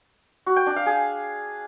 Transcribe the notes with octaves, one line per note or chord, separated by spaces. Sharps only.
F#4
G5
D4
F5
G#4